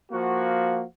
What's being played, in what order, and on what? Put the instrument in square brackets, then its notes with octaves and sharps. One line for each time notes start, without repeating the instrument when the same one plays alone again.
[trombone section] F3 A#3 F#4